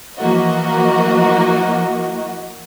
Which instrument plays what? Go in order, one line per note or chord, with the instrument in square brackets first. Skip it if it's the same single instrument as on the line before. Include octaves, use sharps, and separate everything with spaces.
[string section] E3 F3 A#3 F#4 D#5